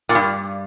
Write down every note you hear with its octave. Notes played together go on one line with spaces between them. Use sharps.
A#2
G2